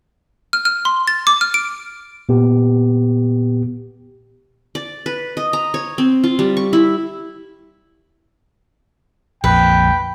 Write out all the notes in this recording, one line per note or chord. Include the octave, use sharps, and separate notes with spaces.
F6
F6
C6
A6
D6
F6
D7
A#2 B3 G4
D5
B4
D#5
A#5
C#5
C4
F4
G3
C#6
E4
A#1 F2 B4 G5